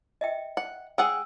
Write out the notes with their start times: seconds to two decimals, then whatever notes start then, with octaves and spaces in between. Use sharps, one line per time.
0.21 D#5 E5 G5
0.57 F#5
0.98 G#4 F#5 G5 D#6 E6